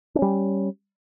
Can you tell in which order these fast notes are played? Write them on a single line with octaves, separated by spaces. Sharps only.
D4 C#4 G3